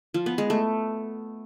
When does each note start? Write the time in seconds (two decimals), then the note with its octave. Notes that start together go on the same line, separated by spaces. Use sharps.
0.14 F3
0.26 B3
0.38 G#3
0.50 A3